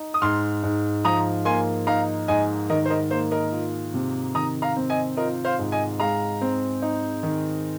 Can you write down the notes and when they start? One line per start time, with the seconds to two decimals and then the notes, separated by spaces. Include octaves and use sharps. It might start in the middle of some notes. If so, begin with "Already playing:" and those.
Already playing: D#4
0.14 D#6
0.22 G#2 C6 F6
0.63 G#2
1.04 F3 A#5 D#6
1.45 A#3 G#5 C6
1.87 D#4 F5 A#5
2.28 G#2 D#5 G#5
2.70 D#3 A#4 D#5
2.85 C5
2.90 A#4 D#5
3.10 A#3 C5
3.31 A#4 D#5
3.52 F4
3.94 C3
4.34 D#3 A#5 D#6
4.62 F5 A#5
4.77 C4
4.90 D#5 G#5
5.17 F4 A#4 D#5
5.45 C5 F5
5.59 G#2
5.72 D#5 G#5
6.00 G#3 F5 A#5
6.41 C4
6.82 D#4
7.23 D#3